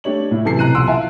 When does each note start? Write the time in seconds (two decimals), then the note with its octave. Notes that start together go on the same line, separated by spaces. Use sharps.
0.04 A3 D4 G4 C#5 F#7
0.31 A2 E4
0.45 F#2 C3 E3 A4 A5 C7
0.59 B2 E3 A#5 F#6 D#7
0.74 B1 F3 F#5 C6 E6 D7
0.87 E4 E5 F5 G#5 A5